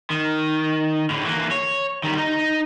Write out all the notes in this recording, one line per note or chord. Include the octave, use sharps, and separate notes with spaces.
D#3
A2 D3
E3 A#3
C#5
D#3 G3
D#4